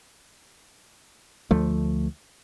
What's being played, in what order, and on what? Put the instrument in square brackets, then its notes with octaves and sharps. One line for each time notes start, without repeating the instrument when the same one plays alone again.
[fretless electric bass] D2 F3 A3